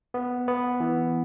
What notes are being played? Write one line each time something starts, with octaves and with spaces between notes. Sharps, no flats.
B3
B3
E3